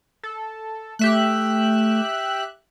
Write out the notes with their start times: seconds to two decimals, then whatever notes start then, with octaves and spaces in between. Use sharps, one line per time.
0.23 A4
0.99 A3 G4 E5 F#6